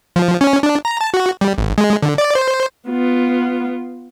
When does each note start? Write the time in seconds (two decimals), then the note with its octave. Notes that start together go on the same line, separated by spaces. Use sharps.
0.16 F3
0.41 C#4
0.63 D4
0.85 A#5
1.01 A5
1.14 F#4
1.41 G3
1.58 G#1
1.78 G#3
2.02 D3
2.18 D5
2.35 C5
2.88 B3 F4